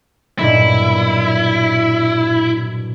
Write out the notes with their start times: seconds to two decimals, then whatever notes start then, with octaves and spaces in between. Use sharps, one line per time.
0.39 B1 G2 A#2 E4